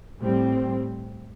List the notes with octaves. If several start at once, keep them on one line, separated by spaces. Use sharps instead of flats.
A2 G3 C4